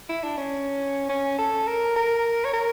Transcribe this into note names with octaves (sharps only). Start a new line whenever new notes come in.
E4
D4
C#4
C#4
A4
A#4
A#4
C#5
A#4